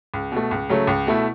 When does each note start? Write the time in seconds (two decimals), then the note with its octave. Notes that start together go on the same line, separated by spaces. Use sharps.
0.14 C#2
0.32 B2 A3
0.51 C#2
0.69 C#3 F#3 A3
0.87 C#2
1.07 B2 A3 E4